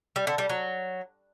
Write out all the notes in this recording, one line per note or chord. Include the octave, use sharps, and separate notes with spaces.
G3
D3
G3
F#3